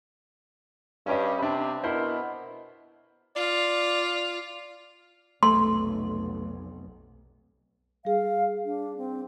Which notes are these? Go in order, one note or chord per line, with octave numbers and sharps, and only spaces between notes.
G2 C#4 G4 D#5
C3 D4 B5
B2 E4 A#4 C5
F4 D5
F1 B1 A3 C6
G3 G#4 F5
D4
C4